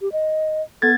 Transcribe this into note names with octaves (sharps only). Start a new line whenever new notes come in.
G4
D#5
B3 A4 G#6 A6